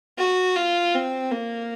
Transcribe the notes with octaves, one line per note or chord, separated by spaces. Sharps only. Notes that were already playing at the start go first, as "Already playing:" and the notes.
F#4
F4
C4
A#3